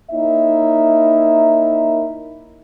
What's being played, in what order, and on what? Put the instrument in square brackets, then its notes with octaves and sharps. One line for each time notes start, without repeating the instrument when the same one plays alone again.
[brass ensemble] A#3 D#4 E4 A#4 C#5 E5